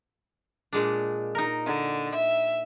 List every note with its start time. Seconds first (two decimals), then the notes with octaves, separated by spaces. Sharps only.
0.73 A#2 G#3 D4
1.35 D#4 A#4
1.66 D3
2.15 E5